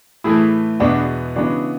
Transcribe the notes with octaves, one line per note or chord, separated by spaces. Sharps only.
A2 E3 A3 E4 G#4
E2 B2 G#3 B3 D4 F#4
C#3 E3 G#3 B3 D4 F#4